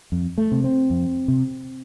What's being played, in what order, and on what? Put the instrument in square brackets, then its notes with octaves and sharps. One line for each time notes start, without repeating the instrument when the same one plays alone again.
[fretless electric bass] F2
A3
C3
C4
F2
C3